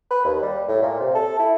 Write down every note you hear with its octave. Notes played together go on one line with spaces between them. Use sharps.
B4
D#2
G3
A2
A#2
C3
A4
E4